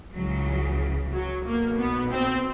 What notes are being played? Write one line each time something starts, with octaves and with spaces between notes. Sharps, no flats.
C#2 C#3 E3 F#3
F#3
B1 B2 A#3
B3
C4